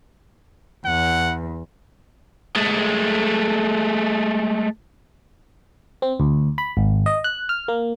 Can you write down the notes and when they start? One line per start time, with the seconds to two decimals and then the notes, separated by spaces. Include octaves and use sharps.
0.86 E2 F#5
2.56 G#3 A3
6.02 C4
6.20 D2
6.58 B5
6.77 G#1
7.06 D#5
7.24 F#6
7.49 F6
7.68 A#3